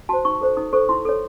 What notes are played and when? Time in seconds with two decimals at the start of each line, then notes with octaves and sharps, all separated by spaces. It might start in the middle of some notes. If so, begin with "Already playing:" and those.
0.09 F#4 C5 A5
0.25 D#4 C#6
0.41 A4 C5
0.57 D#4 D#6
0.73 A4 C5 C#6
0.89 E4 C6
1.05 A4 C#5